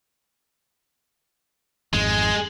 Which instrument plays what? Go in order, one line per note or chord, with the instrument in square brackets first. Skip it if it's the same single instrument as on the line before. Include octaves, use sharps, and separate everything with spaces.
[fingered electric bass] G#1 F2 G#2 [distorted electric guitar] G#3